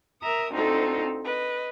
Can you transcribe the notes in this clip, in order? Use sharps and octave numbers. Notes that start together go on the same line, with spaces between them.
A#4 E5 A#5 D#6
D2 C4 D#4 F4 A4
B4 D#5